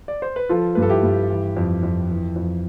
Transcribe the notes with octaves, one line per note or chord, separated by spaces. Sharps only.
D5
C5
B4
F3 F4 A4
G2 B4
A4
E4 G4
G2
E3
F2
F2
E3
F2